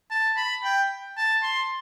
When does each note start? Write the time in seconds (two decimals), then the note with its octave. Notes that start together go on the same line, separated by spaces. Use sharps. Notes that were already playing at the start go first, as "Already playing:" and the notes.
0.11 A5
0.37 B5
0.64 G5
1.17 A5
1.43 C6